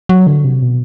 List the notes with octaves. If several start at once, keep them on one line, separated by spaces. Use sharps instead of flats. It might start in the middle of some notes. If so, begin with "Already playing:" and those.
F#3
D3
C3
B2